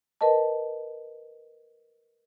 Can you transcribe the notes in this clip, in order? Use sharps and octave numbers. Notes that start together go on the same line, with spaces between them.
A#4 B4 D#5 A5